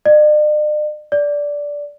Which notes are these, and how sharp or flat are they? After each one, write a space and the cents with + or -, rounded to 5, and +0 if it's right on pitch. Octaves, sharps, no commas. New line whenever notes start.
D5 +45
D5 -10